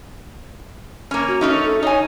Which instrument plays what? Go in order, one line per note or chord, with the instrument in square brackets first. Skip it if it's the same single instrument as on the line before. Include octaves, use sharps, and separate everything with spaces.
[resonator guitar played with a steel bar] A#3 C#4
[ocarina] F#4
[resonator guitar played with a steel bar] A3 C#4 D#4
[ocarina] A4
[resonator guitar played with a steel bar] D#4 G#5 [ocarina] C#5